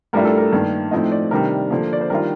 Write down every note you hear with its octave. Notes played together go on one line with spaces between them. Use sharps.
A2 G3 D4 F4 A#4
A4
A#4
G2 D#3 A#3
A2 F3 C4 D#4 D#5
D5
C3 D#3 G3 D4 A#4
D3 F3 A#3
D5
C5
D#3 G3 D4 F4 A#4